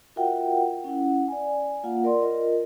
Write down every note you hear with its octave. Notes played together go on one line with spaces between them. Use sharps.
F4 F#4 A#4 E5 F#5 G5
C#4 E4 F#5
D5 G#5
A#3 F4 F5 F#5
A#4 D5 C6
F4 A#4 D#5